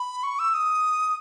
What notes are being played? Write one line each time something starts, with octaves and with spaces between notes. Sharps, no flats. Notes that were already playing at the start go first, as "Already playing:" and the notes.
Already playing: B5
C#6
E6
D#6